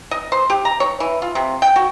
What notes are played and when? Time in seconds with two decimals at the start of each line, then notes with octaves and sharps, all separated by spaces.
0.11 D#5
0.32 C5
0.50 G4
0.65 A#5
0.80 C#5
1.00 E3
1.22 F4
1.35 C3
1.62 G5
1.76 F#4